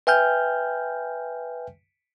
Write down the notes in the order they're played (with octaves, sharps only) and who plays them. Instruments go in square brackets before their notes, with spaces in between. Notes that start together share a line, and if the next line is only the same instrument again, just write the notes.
[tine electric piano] B4 E5 G5 G#5 F6 G6